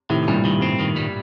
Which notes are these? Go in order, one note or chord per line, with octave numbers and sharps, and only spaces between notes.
A2 C3 D#3
G2 A#2 G3
G2 D#3
G2 C4
D#3
G3